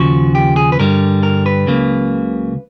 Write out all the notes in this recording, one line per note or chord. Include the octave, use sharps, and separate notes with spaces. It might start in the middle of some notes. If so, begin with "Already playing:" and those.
Already playing: D#2 C#3 F3 F#4
G4
G#4
B4
G2 D3 G3 A#4
A#4
B4
C#2 C#3 F#3 A#3